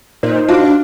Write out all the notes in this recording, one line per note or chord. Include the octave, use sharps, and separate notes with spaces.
A#2 D#4 C5
D4 F4 F#4